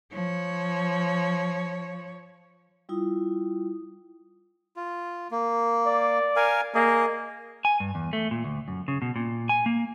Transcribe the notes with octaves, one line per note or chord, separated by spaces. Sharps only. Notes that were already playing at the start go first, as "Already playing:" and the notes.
F3 C#5
G3 E4 F4 D#6
F4
A#3
D5
A#4 F5 G#5
A#3 G#4 D#5
G#5
G2
E2
A3
A#2
D2
F#2
C#3
B2
A#2
G#5
A#3